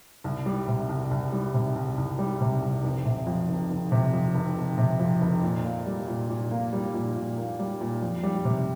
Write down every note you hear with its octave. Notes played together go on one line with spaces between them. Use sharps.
C2
G3
C3
C2
C2
G3
C3
C2
C2
G3
C3
C2
F1
C3
F2
F1
F1
C3
F2
F1
F1
C3
F2
F1
A#2
A#3
G3
A#2
A#2
A#3
G3
A#2
A#2
A#3
G3
A#2
F2
G3
C3